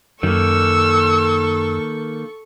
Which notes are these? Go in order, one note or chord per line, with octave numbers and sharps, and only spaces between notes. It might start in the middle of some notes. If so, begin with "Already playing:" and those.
F#2 D#3 A#3 A4 C#6 E6